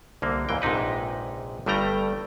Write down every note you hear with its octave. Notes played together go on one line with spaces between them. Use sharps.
C2 D3 A#3
D#2 G#2 E3 G5
A#1 G#2 C3 D#4 B4
G1 G2 G3 A3 G5 A#5